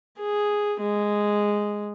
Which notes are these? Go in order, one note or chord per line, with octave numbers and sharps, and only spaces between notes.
G#4
G#3